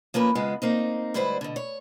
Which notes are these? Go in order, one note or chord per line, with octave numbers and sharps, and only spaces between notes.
F3 A#3 C#4 B4
F2 C#3 G#3 B3 F4
A#3 C4 D#4
D2 G#2 G3 E4 B4 C5
B2 D3
C#5